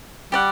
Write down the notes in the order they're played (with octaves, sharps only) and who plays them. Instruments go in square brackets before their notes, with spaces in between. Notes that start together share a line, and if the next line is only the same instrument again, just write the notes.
[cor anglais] G3 [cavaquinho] G4 D5 F#5